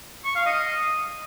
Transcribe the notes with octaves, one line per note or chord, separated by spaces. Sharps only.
C#6
F5
D#5